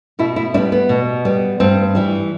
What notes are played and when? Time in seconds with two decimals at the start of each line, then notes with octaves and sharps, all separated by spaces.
0.19 B2 E4
0.36 E4
0.54 G3 D4
0.57 B3
0.72 B3
0.89 B2
1.25 G3 B3
1.60 G2 C4
1.95 E3 G3